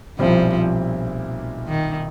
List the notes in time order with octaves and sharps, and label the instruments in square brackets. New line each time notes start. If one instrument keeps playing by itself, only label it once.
[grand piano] B1 A#2 G3 C4 E4 [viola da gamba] F3
[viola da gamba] D#3